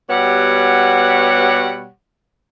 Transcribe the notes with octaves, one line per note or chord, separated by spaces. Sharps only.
B2 G3 B3 G4 C#5 F#5